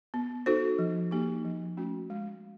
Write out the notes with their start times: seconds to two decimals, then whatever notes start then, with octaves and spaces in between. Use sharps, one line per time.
0.14 B3
0.46 D#4 F#4 A4 C5
0.79 F3
1.11 A#3 D#4 G4
1.45 F3
1.77 A3 C#4 F#4
2.10 G#3